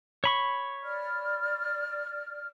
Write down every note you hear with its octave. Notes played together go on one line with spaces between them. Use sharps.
C#5 B5 C#6
D5 F6